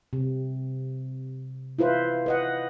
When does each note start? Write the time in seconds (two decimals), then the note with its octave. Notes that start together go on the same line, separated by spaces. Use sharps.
0.13 C3
1.79 E4 F4 B4 C5
2.26 B4 D#5 F#5